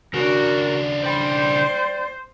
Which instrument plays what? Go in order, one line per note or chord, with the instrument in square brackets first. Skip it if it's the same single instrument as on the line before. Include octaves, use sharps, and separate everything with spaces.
[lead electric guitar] C#3 D4 [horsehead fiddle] F#4 [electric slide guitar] A#4
[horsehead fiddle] C5 [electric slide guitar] D5 G5